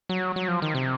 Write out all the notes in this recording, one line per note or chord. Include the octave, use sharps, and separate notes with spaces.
F#3
F#3
F3
D#3
C3